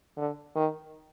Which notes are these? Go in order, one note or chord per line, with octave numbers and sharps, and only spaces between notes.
D3
D#3